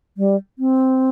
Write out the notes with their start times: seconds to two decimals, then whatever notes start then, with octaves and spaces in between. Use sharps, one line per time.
0.17 G3
0.59 C4